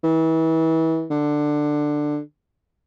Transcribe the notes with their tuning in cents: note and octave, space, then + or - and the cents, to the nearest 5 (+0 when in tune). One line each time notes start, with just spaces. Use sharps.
E3 -30
D3 +15